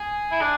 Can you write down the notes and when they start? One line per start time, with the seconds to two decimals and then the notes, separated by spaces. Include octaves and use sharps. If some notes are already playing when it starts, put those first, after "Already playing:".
Already playing: G#4
0.32 E4
0.41 D4 G#4